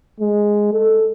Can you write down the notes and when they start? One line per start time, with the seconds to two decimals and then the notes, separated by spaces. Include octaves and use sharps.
0.20 G#3
0.73 A4